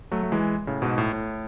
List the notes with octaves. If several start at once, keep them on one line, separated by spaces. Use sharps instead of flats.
F#3 A3
A3
E3 G#3
A2 C#3
G#2 B2
A2
A2